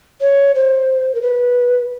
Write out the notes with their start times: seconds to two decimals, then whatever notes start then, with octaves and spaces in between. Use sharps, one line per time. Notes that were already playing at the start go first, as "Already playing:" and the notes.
0.21 C#5
0.55 C5
1.15 A#4
1.22 B4